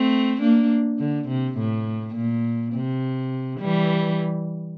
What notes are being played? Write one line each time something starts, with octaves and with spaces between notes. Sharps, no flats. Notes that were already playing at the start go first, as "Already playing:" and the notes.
Already playing: A3 C4
A#3 D4
D3
C3
A2
A#2
C3
E3 G3